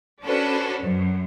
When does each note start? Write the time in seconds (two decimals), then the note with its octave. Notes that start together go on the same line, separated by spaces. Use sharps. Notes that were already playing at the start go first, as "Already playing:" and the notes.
0.23 C#4 D4 F#4 A4 B4 C5
0.82 F#2